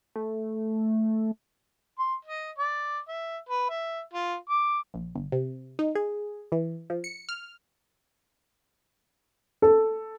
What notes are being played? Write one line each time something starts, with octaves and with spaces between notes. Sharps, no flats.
A3
C6
D#5
D5
E5
B4
E5
F4
D6
A#1
G1
C3
D#4
G#4
E3
F3
C#7
F6
A4